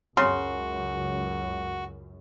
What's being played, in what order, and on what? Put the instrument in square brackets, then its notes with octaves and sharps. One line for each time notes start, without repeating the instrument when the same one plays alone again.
[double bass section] C#2 F#2 [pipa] C#3 [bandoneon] F#4 [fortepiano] C6